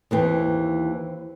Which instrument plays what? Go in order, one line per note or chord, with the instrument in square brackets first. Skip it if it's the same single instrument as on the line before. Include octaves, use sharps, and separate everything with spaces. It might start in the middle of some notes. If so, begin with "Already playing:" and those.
[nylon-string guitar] D#2 E3 C4